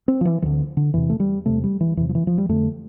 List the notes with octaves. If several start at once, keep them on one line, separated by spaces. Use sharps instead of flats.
C4
F3
E3
D2 D3 E3
D3
E2 C3 E3
A3
G3
E2 C3 A3
G3
E3
E2 C3 E3
F3
E3
F3
G3
F2 D3 A3